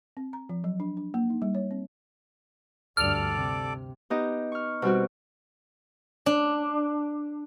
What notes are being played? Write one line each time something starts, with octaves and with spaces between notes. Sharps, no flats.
C4
A#5
F3
F#3
D4
D4
A#3
D#4
G3
C#5
C4
D2 G2 A4 D5 D6 F6
C3
B3 D#4 G4 D#5
C#6 F6
B2 G3 C4 F#4
D4